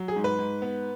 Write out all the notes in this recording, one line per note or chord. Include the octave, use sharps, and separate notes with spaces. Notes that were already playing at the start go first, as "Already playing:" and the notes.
Already playing: F#3
G#4
G#2
B4
G#2
B3